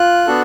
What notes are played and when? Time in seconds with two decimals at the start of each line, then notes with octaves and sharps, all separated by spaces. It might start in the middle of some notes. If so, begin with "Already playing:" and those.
Already playing: F4 F#6
0.26 B3 D4 F#4 A4